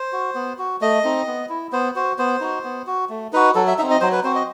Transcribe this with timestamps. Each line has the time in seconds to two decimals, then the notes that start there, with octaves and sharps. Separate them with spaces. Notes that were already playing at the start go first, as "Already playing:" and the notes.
Already playing: C5
0.12 F#4
0.35 B3
0.58 F#4
0.81 A3 D#5
1.04 C4 D#4
1.27 B3
1.49 E4
1.72 B3 C5
1.95 F#4 C5
2.18 B3 C5
2.41 D#4 F#4
2.64 B3
2.87 F#4
3.09 A3
3.33 D#4 F#4 B4
3.55 F#3 A4
3.67 E5
3.78 C4 D#4 E5
3.90 D#5
4.01 F#3 C5
4.12 B4
4.24 C4 F#4 C5
4.35 D#5